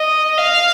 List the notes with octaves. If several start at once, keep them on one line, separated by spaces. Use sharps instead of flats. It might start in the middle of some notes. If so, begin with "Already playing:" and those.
Already playing: D#5
F5